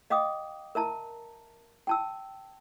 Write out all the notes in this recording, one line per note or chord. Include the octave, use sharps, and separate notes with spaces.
D#5 F5 G5 D6 D#6
A#4 E5 A5 A#5
G5 A5 E6